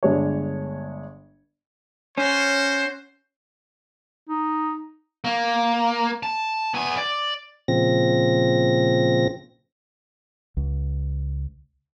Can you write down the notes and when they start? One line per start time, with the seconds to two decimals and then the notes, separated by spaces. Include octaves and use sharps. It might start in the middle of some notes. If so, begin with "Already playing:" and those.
0.03 G1 G#3 D4 C#5
2.18 C#4 F#4 C5
4.29 D#4
5.24 A#3
6.23 A5
6.74 B3 G#5
6.97 D5
7.68 A#2 C#3 F3 C4 A#6
10.57 C#2